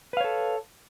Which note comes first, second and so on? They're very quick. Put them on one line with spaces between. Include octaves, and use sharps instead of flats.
B4 F5 C#5 A4